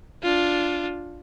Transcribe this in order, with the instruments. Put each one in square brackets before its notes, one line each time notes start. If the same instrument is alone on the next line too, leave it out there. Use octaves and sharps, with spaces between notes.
[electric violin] D4 F4